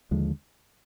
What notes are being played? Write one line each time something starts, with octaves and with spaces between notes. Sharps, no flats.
D#2 D3 F3 G#3